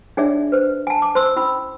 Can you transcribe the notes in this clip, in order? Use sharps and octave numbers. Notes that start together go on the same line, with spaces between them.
D4 D#4 G#4 C#5 D5 E5
B4 C5
G#5 A5
D6
C5 C6 E6
C#4 E4 B5 E6